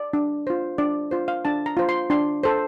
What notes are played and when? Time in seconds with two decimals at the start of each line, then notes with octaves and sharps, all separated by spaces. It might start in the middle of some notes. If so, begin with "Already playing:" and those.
Already playing: D5
0.13 D4
0.47 F4 C5
0.78 D4 D5
1.11 F4 C5
1.28 F5
1.45 D4 A5
1.66 A#5
1.77 F4 C5
1.89 C6
2.10 D4 C6
2.43 A4 C5